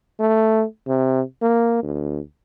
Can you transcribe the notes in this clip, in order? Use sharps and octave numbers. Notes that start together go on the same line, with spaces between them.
A3
C3
A#3
D2